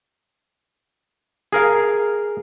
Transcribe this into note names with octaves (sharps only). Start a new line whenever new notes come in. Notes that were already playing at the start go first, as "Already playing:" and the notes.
G#4 A#4 F5